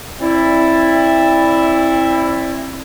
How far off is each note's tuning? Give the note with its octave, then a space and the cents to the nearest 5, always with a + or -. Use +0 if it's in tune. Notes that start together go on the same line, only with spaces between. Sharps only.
C4 +35 E4 +0 D5 +0